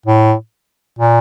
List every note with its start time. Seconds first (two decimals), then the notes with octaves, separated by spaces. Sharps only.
0.06 A2
0.99 A#2